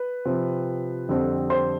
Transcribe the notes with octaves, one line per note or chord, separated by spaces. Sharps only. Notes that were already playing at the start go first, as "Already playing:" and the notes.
Already playing: B4
C3 F3 C4
F2 D3 G3 C4
C5